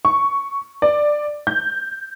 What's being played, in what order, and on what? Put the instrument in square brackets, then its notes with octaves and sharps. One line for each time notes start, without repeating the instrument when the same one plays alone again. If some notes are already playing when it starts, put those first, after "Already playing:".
[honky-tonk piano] C#6
D5
G6